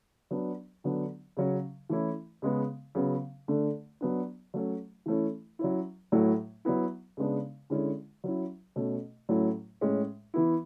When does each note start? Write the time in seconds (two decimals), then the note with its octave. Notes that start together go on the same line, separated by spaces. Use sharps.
0.31 F#3 B3 D4
0.84 D3 F#3 B3 D4
1.37 C#3 F#3 C#4
1.90 E3 A3 C#4 E4
2.42 C#3 G#3 B3
2.95 C#3 F#3 B3
3.48 D3 A3 D4
4.01 F#3 B3 D4
4.54 F#3 A3 C#4
5.06 E3 A3 C#4 E4
5.59 F#3 C#4 E4
6.12 A2 F#3 A3 E4
6.65 F#3 B3 E4
7.17 C#3 G#3 B3 D4
7.70 D3 G#3 C#4 E4
8.24 F#3 C#4 E4
8.76 B2 A3 C#4
9.29 A2 F#3 A3 C#4 E4
9.81 A2 G#3 C#4
10.34 E3 B3 E4